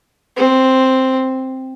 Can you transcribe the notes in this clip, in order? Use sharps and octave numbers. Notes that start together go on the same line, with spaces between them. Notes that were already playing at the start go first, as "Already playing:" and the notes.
C4